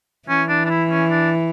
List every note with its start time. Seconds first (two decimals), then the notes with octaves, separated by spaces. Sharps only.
0.29 E3 C#4
0.49 D4
0.66 D4
0.70 E4
0.90 C#4
1.11 D4